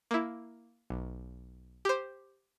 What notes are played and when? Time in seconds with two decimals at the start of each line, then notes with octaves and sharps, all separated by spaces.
0.11 A#3 E4
0.90 B1
1.85 G4 C5